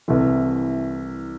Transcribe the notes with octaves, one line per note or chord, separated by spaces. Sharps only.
C2 C3 E3 A3